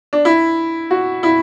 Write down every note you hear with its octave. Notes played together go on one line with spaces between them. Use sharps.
D4
E4
F#4
E4